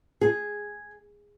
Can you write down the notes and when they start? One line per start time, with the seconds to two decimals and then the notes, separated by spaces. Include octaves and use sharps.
0.21 G#4